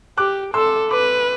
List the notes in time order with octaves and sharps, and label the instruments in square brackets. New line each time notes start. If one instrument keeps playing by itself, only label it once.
[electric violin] G4 [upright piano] D6 F#6
[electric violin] A4 [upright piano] C6 E6
[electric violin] B4 [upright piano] B5 D6